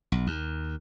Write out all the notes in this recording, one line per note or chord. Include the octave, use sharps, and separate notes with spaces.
B1
D#2